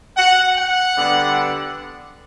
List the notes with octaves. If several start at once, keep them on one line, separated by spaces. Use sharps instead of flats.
F#5
F#5
D3 G3 B3 D4